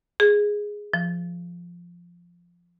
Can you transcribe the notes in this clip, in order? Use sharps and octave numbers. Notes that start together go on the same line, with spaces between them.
G#4
F3